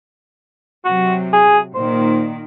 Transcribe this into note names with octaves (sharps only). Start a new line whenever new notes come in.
C3 F#3 F#4
G#4
A#2 D#3 C5